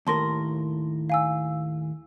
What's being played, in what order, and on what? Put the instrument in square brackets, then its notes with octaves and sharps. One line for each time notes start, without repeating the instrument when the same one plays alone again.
[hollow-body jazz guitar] D#2 A2 A#4 [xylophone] A5 C6 A#6
[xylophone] F5 G#5 E6